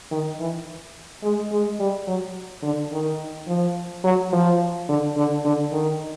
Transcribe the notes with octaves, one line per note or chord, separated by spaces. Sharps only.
D#3
E3
G#3
G#3
G3
F#3
D3
D#3
F3
F#3
F3
D3
D3
D3
D#3